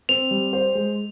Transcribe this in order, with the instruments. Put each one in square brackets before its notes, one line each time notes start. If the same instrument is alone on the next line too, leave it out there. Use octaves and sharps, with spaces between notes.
[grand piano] C4 [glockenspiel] F7
[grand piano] G3
C5
G#3